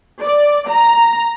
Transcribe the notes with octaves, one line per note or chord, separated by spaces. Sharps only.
D5
A#5